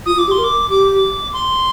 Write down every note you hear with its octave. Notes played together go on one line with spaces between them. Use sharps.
F4 D#6
F4
D6
G4
C6
A#4
D6
G4 D6
C6